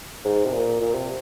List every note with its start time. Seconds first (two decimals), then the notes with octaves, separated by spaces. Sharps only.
0.25 G#2
0.45 C3
0.53 A#2
0.81 A#2
0.94 C3